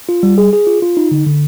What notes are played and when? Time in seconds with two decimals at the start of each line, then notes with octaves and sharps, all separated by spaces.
0.09 F4
0.23 G3
0.38 G#4
0.53 G#4
0.67 F4
0.82 F4
0.97 D#4
1.11 D3
1.26 D3